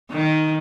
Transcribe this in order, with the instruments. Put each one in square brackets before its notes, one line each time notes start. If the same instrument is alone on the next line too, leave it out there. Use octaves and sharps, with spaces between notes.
[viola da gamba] D#3